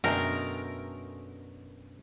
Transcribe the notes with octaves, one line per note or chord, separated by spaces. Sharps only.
F#2 B2 D3 G#3 A3 A#4 G5